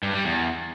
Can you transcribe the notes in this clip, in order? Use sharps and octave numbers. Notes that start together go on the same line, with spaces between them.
G2
G3
E2